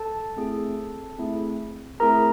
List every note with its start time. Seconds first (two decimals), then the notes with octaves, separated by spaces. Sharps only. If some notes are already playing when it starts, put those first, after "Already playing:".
Already playing: A4 A5
0.36 A3 C4 E4 G#4
1.18 A3 C4 E4 G#4
2.00 A3 C4 E4 G#4 A#4 A#5